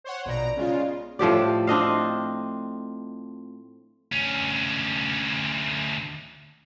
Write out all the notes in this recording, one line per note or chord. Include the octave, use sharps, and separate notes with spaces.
C5 C#5 F#5
A#1 B2 B3 D5 A#5
C#3 G#3 F4
A2 F3 G4 D5
C4 D4 D#5 F5
D2 C#4